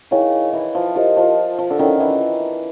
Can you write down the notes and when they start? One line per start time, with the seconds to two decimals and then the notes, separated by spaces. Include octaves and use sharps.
0.11 D#3 E4 G#4 C#5 F5 G#5
0.53 E3
0.75 F3
0.96 F3 E4 G4 A#4 D#5
1.17 F3
1.59 F3
1.70 D3
1.79 D#3 C#4 E4 A4 C#5 F#5
2.00 E3